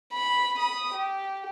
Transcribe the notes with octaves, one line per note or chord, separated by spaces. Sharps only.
B5
B5 D#6
G4